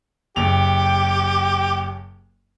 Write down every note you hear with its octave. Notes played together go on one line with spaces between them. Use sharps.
F#1 G4 F7